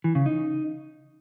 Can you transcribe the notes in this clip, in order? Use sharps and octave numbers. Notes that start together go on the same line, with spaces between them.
E3
C#3
D#4